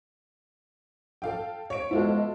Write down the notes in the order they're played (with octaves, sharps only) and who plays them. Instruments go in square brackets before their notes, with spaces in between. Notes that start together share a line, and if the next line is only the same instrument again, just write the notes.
[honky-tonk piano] A4 F5 G5
C#5 D7
[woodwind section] B2 F3 G#3 [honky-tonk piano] E4 F4 A4